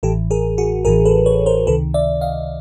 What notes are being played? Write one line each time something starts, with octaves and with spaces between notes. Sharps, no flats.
A1 A2 E3 G4 A4
G#4 A#4
F#4 G#4
A1 A2 E3 G#4 A#4
A4 B4
B4 C#5
A#4 C5
C#2 C3 D#3 A4 B4
D5 E5
D#5 F5